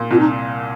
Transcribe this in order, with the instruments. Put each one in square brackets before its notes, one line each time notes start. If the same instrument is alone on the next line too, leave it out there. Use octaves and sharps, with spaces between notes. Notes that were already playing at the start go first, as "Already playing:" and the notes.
Already playing: [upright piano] A#2
[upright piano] C2 [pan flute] F4
[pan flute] D#4